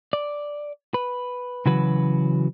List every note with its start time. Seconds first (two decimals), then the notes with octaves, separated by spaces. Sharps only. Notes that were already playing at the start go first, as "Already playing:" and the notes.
0.13 D5
0.94 B4
1.66 C#3 E3 F#3 F#4 B4